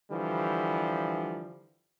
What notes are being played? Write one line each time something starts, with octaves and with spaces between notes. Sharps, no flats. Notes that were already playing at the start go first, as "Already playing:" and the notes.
D3 E3 F3 G3